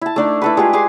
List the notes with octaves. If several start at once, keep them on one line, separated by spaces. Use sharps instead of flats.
E4 A5
A3 D4 D#4
E4 A4 B4
G#3 F4 G4 G#4
G#4 G#5 C6 D6